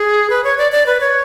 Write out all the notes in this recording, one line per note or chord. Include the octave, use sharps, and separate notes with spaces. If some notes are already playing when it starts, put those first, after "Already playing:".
Already playing: G#4
B4
C#5
D5
D5
B4
C#5